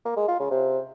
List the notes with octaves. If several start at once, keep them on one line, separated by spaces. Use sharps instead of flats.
A#3
G#3
F4
C#3
C3